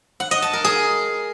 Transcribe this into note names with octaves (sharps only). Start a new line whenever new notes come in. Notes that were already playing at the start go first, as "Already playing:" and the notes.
F#5
D#5
A5
A#4
G#4